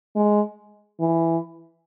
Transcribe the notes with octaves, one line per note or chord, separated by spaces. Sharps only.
G#3
E3